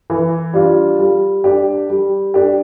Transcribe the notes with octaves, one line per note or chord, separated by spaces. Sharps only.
E3
G3 D4 F4
G3
D4 G4
G3
D4 G4